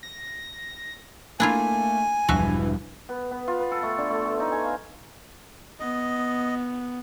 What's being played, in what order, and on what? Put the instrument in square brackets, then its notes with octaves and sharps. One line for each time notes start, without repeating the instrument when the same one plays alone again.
[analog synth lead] A#6
[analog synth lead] A3 [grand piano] A#3 [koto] D4 E4 F4 [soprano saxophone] G#5
[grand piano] E1 G2 [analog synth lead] E3 [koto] F3 F#4 E5
[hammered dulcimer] B3
B3
F4
B4
A4
A3
D3
A3
A4
D#4
G#5
F5
[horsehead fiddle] B3 [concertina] D#5